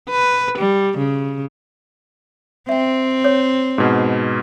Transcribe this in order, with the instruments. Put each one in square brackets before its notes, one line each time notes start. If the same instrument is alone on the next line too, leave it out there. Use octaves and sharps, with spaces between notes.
[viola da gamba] B4
G3
C#3
[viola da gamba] C4 [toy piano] E5 G5
[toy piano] C#5
[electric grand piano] G#2 B2